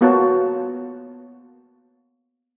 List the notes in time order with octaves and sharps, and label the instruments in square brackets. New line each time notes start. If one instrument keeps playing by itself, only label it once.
[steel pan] A#3 B3 F4 F#4 C#5 A5